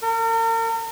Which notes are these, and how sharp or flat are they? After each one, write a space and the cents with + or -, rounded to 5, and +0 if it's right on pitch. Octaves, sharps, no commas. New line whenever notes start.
A#4 -40